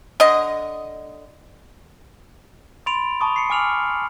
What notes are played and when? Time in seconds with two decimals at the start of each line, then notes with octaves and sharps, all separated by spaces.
0.20 D3 D#5
2.86 B5 C6 A6 D7 F7
3.21 A5 B5 C#6 D#6
3.36 C7 C#7
3.50 G#5 D6 F6 F7 F#7